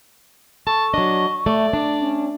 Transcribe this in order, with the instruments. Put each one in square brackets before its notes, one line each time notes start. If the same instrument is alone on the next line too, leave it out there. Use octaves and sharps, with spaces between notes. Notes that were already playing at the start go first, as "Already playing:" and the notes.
[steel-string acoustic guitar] A4 [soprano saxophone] A5 [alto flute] C#6
[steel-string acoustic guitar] F#3 D4 [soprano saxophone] D#5
[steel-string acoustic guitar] A3 [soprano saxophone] D5
[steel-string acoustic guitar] D4
[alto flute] C#4